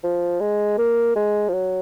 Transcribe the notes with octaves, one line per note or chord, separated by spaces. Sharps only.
F3
G#3
A#3
G#3
F3
F#3